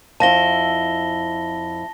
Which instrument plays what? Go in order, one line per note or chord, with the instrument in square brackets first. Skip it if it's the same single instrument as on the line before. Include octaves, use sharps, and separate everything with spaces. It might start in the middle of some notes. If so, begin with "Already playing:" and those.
[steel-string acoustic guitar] F2 E4 [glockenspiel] A5 A#6 G7